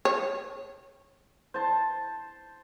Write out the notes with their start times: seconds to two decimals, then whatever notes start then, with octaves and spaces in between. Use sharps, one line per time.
0.05 C#5
1.54 C5 A5